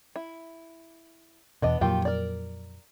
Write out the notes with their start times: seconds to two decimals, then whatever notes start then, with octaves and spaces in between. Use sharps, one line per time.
0.16 E4
1.62 E2 B2 B3 D4 D#5
1.81 F2 A#2 D#3 F#3 F4 G4
2.05 A#4 D5